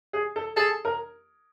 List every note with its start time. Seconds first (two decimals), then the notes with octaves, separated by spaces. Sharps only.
0.13 G#4
0.36 A4
0.56 G#4 A4
0.85 A#4